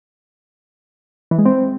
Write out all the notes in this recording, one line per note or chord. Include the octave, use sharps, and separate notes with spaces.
E3
G#3
C4